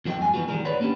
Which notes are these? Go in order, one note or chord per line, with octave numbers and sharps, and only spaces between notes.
E2 F#3 F#4 A4 D#5 G5
F#2 G#3 G#5
E3 G3 G#3 B3 F4 F#4
E2 D#3 F3 G3 G#3 A#4
B4 C#5 D5 F#5 B5
A#3 B3 C#4 D4 G4